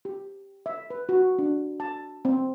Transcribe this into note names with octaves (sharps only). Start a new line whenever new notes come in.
G4
E5
B4
F#4
D4
A5
C4